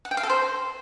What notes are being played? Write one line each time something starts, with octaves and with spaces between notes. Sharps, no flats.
F#5
G5
F5
A4
C5